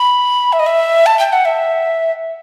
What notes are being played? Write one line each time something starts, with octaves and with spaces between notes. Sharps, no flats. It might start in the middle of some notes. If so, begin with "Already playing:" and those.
Already playing: B5
E5
D#5
E5
A5
G5
F#5
E5